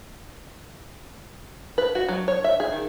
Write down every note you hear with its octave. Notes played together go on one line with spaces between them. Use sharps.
B4
F#4
F#3
C#5
E5
G#4
D#3